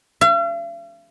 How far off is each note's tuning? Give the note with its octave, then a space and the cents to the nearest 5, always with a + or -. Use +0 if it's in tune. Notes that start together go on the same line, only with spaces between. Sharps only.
F5 -45